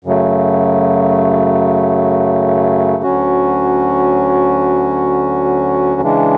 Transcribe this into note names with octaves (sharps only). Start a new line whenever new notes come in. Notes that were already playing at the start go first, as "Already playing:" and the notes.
F#2 C#3 F#3 A3
D2 D3 F#3 C#4 F#4
C#3 E3 G#3 D4